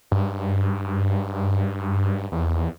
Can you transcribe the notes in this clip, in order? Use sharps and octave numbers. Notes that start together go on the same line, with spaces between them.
G2
E2